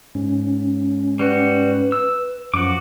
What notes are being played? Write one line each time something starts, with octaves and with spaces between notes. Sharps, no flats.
G#2 C#4
G3 F#4 B4
E6
F#2 F3 F#4 D6